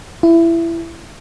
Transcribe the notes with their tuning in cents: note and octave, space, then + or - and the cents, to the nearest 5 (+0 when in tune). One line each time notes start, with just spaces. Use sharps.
E4 +20